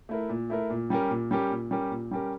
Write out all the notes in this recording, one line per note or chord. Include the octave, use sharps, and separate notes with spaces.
A3 E4 A#4
A#2
A3 E4 A#4
A#2
G3 C#4 G4 A#4
A#2
G3 C#4 G4 A#4
A#2
G3 C#4 G4 A#4
A#2
G3 C#4 G4 A#4